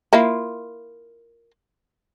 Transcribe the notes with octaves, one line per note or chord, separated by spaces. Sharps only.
A#3 E4 F4